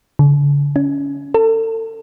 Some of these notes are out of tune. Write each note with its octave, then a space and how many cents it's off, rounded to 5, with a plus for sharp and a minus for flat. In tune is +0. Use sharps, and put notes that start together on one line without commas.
D3 -40
C#4 +25
A4 +35